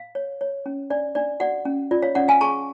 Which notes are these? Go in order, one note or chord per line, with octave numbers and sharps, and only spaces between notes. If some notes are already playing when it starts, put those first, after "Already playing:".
Already playing: F5
C#5
C#5
C#4
D4 D5
D4 D5
F#4 D5 F#5
C#4
F4 D5
C#5 F5
C#4 D5 F#5
F5 G#5
G#4 A5 C#6